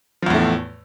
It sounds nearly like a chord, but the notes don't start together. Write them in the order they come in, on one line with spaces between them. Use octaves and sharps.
F3 E2 A2 A3